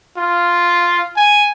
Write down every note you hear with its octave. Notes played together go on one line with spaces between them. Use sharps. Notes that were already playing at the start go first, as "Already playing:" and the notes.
F4
G#5